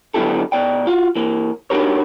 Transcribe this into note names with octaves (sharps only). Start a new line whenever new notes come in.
D3 F#3 B3 E4 G4 A4
B2 D5 G5
F4 F#4
E3 A#3
D4 D#4 F#4 G4 A#4 C#5